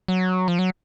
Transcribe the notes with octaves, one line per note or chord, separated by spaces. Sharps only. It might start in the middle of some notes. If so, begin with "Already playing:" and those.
F#3
F3
F#3